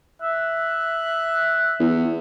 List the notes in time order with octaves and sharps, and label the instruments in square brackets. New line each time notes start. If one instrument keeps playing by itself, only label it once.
[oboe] E5 [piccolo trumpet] F#6
[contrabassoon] E2